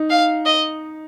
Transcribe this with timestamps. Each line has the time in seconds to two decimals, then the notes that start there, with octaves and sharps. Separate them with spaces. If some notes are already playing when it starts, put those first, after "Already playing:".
Already playing: D#4
0.10 F5
0.46 D#5